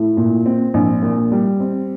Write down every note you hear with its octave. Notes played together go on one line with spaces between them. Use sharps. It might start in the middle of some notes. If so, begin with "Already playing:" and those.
Already playing: A2
A#2
C4
A#1
A#2
G3
C4